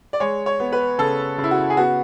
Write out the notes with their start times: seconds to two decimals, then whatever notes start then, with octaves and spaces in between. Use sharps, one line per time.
0.13 D5
0.20 G#3 C#5
0.46 C#5
0.60 B3
0.73 B4
0.98 C#3 A4
1.38 C#3
1.44 E4
1.51 F#4
1.70 G#4
1.77 B3 F#4